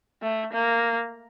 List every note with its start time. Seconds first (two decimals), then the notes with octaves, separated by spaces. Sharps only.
0.22 A3
0.53 A#3